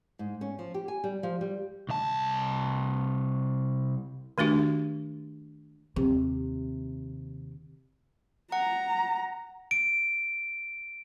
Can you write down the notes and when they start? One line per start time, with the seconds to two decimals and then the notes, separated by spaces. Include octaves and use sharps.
0.19 G#2
0.41 C#4
0.59 F3
0.74 G4
0.88 G#5
1.04 G3
1.23 F3
1.41 G3
1.89 C2 A5
4.38 D#3 A3 D4 F#4 G4
5.96 D#2 C3
8.52 F#5 A#5
9.71 D7